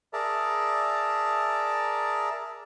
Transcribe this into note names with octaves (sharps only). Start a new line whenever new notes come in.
G#4 A#4 D5 E5 A5 A#5